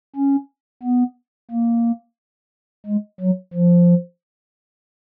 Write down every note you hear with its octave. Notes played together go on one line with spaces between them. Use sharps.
C#4
B3
A#3
G#3
F#3
F3